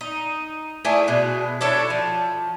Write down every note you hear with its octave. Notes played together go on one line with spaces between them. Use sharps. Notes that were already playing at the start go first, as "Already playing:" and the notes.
D#4
A3 E4 G#4 D5
B2 G#3
D4 E4 A4 C#5
F3